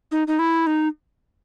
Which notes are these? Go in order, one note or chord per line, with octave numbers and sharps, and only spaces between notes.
D#4
D#4
E4
D#4